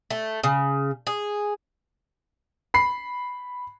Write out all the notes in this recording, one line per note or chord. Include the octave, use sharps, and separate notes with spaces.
A3
C#3
G#4
B5 C7